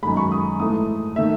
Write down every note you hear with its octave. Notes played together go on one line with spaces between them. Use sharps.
F#2 D#3 G#3 B5
C#6
D#6
G#2 E3 A3 D#6
D#3 A3 E5